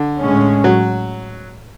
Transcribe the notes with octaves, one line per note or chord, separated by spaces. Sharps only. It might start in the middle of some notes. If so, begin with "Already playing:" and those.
Already playing: D3
A2 G#3 C#4
F#3